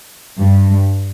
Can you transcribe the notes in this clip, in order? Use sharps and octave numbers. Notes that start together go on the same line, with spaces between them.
G2